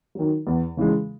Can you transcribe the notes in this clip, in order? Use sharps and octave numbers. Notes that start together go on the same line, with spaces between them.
D#3 F#3
E2
C#3 E3 G#3